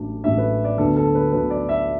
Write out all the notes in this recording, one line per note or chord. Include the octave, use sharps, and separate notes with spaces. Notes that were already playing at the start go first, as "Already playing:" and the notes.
Already playing: A1 A2 F#3 D4
A1 A2 F#3 D4 E5
B4
D5
D2 D3 F#3 B3 D4 A4
A4
B4
D2 D3 F#3 B3 D4 B4
D5
E5